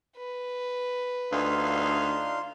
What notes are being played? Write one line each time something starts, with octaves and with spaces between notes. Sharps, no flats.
B4
D2 D4 D#4 F4 F5 C6